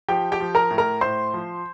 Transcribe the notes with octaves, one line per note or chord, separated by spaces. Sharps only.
F3 G4 G5
G4 G5
F3
A#4 A#5
A2
A#4 A#5
A2 C5 C6
F3